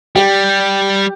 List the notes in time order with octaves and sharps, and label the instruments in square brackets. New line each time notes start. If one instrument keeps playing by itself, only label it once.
[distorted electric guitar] G3 [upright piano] G4